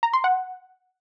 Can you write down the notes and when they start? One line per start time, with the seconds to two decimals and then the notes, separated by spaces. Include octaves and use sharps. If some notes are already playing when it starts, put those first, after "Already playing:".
0.03 A#5
0.13 C6
0.24 F#5